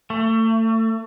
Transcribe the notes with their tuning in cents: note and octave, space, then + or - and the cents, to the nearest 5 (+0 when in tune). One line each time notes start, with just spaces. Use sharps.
A3 +30